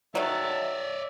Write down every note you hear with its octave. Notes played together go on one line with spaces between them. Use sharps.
D#3 F#3 C#5 D5 E5 A5
E5